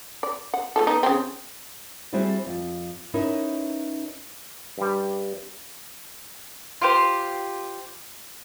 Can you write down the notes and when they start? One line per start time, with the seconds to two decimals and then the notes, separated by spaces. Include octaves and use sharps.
0.23 D5
0.54 F#5
0.76 A3 F4 A4
0.87 B3 D#4
1.03 C#3 F3 C4
2.12 G3 C4 E4 F#4 G#4 D5
2.47 F2
3.14 C#4 D#4 E4 A#4 B4
4.78 G2 G3
6.81 F4 G4 C5